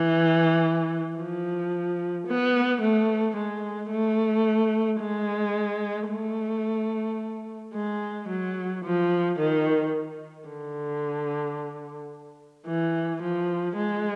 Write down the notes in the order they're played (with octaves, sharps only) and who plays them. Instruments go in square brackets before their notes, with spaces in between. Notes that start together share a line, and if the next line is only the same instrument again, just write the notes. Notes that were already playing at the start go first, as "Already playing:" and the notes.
Already playing: [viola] E3
F3
B3
A3
G#3
A3
G#3
A3
G#3
F#3
F3
D#3
D3
E3
F3
G#3